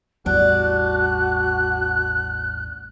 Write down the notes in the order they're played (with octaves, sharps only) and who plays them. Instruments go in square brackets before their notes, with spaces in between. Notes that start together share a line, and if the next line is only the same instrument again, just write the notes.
[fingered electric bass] A1 E2 G3 [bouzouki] D4 [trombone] F#4 [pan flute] F#6